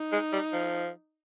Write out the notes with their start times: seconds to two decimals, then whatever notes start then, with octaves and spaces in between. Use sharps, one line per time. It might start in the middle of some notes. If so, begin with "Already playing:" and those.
Already playing: D#4
0.13 G#3
0.33 G3
0.53 F3